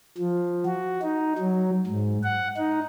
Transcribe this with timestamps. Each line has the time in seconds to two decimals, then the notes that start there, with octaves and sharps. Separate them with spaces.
0.18 F3
0.65 F#4
1.03 D#4
1.39 F#3
1.87 G#2
2.23 F#5
2.57 D#4